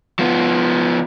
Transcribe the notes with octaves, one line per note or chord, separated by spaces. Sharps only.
F3 B3